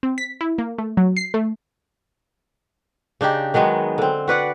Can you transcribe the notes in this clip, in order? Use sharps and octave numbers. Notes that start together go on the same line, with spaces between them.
C4
B6
E4
A#3
A3
F#3
C7
A3
C#3 D4 D#4 G4
D#3 F#3 G#3 B3
D3 C4
F#4 B4 D5 F#5